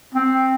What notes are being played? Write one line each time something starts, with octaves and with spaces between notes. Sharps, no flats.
C4